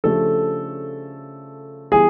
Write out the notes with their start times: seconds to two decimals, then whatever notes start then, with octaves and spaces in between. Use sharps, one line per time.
0.04 C#3 F3 A3 D4 G4 A4
1.92 E3 G3 B3 G#4